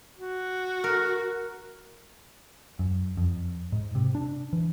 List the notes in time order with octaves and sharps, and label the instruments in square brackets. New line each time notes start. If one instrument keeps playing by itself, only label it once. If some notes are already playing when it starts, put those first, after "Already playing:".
[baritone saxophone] F#4
[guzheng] A#4
[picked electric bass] F#2
F2
G#2
C3
D4
E3